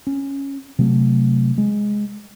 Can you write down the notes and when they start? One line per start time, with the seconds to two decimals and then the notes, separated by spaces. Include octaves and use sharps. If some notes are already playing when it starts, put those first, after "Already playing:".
0.07 C#4
0.79 C3 F#3 A3
1.58 G#3